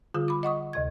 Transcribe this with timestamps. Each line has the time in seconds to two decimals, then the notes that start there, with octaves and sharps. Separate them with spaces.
0.14 D3 G3 F4 G#4
0.28 B5 D6
0.43 D#5 F#5 C#6 D#6
0.73 D2 C3 G#6